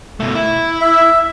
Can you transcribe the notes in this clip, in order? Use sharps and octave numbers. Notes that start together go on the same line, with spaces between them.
B2 A3
E4
E5